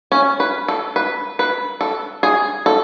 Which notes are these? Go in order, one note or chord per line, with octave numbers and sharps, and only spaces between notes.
C#4
B4
A4
B4
B4
A4
G#4
A4